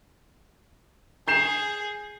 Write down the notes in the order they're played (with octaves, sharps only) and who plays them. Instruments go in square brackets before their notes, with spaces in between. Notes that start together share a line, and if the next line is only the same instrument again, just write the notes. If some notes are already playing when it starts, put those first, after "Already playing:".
[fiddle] G#4 [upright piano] G6 C7 E7